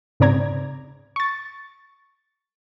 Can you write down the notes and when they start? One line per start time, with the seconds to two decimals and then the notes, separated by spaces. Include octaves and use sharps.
0.20 G#2 C#3 C4 D5 A#5 G#6
1.16 C#6 A6